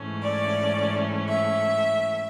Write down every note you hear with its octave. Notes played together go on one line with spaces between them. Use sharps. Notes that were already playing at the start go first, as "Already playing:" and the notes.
Already playing: G#2 E3 A3 C#4
D5
E5